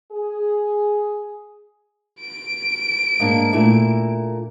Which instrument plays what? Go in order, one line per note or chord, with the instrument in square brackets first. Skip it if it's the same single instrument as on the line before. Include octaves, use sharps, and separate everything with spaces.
[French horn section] G#4
[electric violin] D7
[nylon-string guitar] G#2 A#3 D4
A#2 A3 E4